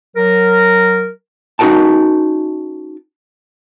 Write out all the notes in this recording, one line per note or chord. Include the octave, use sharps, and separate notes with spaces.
F#3 A#4
C#4 D#4 F#4 A#4 G5 A5